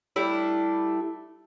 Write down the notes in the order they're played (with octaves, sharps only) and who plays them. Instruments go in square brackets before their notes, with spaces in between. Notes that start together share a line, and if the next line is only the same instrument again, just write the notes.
[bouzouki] G3 A3 D4 E4